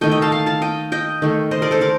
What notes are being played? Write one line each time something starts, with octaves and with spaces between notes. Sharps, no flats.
D#3 A3 D#5 G5
D#5 G5
F5 A5
F5 A5
F5 A5
D#5 G5
D#5 G5
D#3 A3
C5 D#5
A#4 D5
A4 C5
A#4 D5